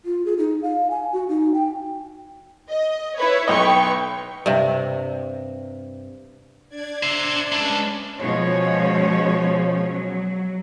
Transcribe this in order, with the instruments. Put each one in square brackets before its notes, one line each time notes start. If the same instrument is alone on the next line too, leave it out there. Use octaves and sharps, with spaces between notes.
[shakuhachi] F4
G#4
D#4
F5
G#5
F#4
D#4
G5
[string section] D#5
E4 B4 C#5
[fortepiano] B1 D#5 [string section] B4 G5 C#6
[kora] G2 C3
[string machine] D4 D5 G#6
[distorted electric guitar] C5 E5
[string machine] G#3 C#4 B4 [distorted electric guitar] D4 E4
[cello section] B2 F3 G#3 C#4 C#5
F#3